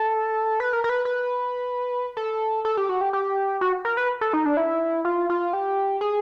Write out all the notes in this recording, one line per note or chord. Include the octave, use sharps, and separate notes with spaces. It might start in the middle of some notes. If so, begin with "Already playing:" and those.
Already playing: A4
B4
A#4
A#4
B4
B4
A4
A4
G4
F#4
G4
G4
F#4
A#4
B4
A4
D#4
D4
E4
F4
F4
G4
G#4